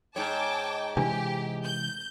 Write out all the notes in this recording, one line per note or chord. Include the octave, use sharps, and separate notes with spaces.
G#2 C#5 G5 A5 D6
C3 E3 G#3 D4 G4
G6